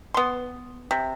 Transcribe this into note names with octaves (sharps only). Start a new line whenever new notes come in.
B3 C6
C3